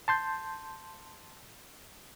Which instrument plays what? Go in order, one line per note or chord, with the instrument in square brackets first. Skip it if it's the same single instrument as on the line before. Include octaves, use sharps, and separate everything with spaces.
[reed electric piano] A5 C6 G6